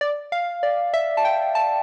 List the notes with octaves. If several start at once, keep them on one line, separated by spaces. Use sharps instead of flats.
D5
F5
D5
E5
A5
G5
A5